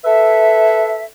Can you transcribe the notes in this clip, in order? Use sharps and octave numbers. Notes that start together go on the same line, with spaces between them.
A4 B4 E5